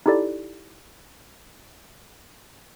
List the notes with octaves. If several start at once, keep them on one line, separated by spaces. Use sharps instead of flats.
D#4 E4 G4 A4 D5